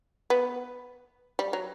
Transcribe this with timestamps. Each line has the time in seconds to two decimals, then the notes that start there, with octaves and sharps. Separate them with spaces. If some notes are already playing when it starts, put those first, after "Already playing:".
0.30 B3
1.39 G3
1.53 F#3